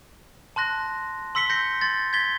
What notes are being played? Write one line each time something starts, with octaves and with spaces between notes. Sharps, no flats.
A5 C6 F#6 A#6
C6 E6 B6 C#7 G7
G6 A#6 C7 C#7
C6 A6
G#6 A6 B6 G7